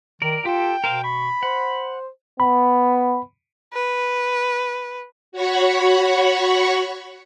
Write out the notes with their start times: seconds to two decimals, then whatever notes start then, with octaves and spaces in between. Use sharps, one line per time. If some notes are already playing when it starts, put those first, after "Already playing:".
0.22 D#3 A#4 D5
0.45 F4 G4 A4 G5
0.84 B2 A#4 C5 F5
1.04 B5 C#6
1.43 C5 F#5
2.40 B3 B5
3.74 B4
5.32 F#4 C#5 F#5 B5 C#6